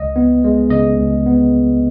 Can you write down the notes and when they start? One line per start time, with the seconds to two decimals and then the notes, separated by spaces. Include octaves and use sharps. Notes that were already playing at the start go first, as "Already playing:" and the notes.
Already playing: C#2 D#5
0.16 B3
0.44 G#3
0.70 C#3 D#5
0.98 C#2
1.26 B3